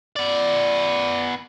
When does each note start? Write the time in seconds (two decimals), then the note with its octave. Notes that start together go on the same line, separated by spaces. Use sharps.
0.16 B3 D5